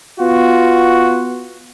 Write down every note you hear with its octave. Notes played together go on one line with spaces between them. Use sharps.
B3 F4 F#4